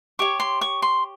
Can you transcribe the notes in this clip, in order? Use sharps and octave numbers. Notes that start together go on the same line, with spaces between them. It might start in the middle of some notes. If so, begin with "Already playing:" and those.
G4 C#5 C#6
C6
C#6
C6